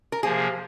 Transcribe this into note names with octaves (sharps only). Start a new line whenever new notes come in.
A#4
C3 F3 A#3 G#4